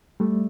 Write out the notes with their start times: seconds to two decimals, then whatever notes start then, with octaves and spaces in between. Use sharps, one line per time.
0.20 G3 A3